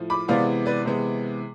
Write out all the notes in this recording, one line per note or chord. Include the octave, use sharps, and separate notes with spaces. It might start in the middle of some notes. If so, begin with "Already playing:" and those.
Already playing: A2 F3
B5 D6
C3 E3 G#3 B3 D5 F5
B4 D5
C3 E3 G#3 B3